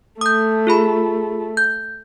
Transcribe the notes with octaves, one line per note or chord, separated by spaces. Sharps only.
A3 D#6 G6
F4 G#4 B5
G6